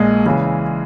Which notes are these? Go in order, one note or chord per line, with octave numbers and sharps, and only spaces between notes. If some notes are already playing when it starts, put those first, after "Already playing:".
Already playing: A#1 A#2 G#3 D#5
C#3 E3 G#3